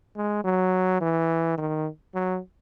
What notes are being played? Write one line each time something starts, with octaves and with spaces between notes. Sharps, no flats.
G#3
F#3
E3
D#3
F#3